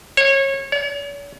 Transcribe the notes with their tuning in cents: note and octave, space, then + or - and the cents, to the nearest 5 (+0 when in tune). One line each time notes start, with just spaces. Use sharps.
C#5 -25
C#5 +45